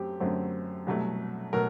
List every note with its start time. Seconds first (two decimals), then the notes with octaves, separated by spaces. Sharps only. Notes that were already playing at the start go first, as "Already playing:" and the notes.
Already playing: F#2 F#3 A3 C4 G4
0.20 F#2 D3 F#3 A3 C4
0.87 C2 B2 F#3 A3
1.53 B2 F#3 A3 A#4